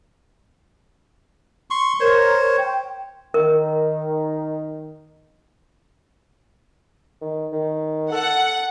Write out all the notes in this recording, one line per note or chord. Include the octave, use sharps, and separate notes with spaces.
C6 C#6
A#4 C5 C#5
G5
D#3 A#4
D#3
D#3
A4 F#5